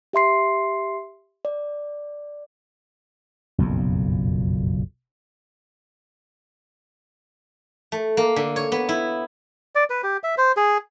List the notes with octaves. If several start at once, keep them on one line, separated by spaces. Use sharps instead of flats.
G4 E5 C6 C7
D5
F#1 B1 F2 A#2
A3
A#3
D3
C#5
B3
E4
D5
B4
G4
E5
C5
G#4